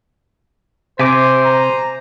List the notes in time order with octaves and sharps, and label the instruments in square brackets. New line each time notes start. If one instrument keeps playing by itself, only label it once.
[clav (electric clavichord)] C3 [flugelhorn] C5 [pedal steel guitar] E5 G#5 D6
[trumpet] A#5